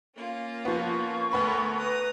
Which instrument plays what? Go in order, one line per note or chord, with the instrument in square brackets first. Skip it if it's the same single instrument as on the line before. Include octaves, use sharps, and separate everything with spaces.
[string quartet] A#3 C#4 F4
[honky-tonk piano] F3 B3 [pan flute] C#6
[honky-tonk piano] D2 B3 B5 [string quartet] A4 A#4 C#5
[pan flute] B4 [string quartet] A#5 D#6